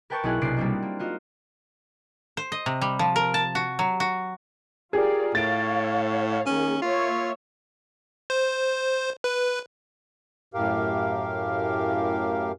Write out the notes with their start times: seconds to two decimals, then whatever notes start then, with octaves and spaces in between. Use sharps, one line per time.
0.10 A#4 B4 G5 A5 C#6 G6
0.23 B1 D#4 E4 G#4 F#6
0.42 B1 C3 D4 C6 C7 D7
0.57 G3 A#3 C4 D4 F#4
0.82 A#3
0.99 D#4 F4 F#4
2.37 C5
2.52 D#5
2.66 C3
2.81 G3
2.99 F3
3.16 A#4
3.34 A5
3.55 F#4
3.79 F#3
4.00 F#4
4.93 F4 G4 G#4 A#4 D5
5.35 A2 C#5 F5 A6 D7
6.46 D#3 A#3 C#4 G#4
6.82 A#3 F4 C#5 E5
8.30 C5
9.24 B4
10.54 F#2 A2 G4 A#4 F5